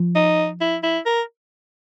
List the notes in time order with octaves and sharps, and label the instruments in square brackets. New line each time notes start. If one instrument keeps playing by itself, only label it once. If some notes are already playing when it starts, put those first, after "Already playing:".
Already playing: [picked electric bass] F3
[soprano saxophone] D#4
E4
E4
A#4